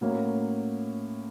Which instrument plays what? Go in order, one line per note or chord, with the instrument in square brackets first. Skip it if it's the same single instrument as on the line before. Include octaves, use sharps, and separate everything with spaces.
[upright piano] A2 F#3 A#3 C#4